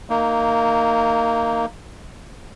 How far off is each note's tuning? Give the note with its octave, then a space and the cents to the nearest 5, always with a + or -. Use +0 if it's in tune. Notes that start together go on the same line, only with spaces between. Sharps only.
A#3 -15 D#4 +0